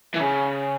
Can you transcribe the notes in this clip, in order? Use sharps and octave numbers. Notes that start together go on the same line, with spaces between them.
E3
C#3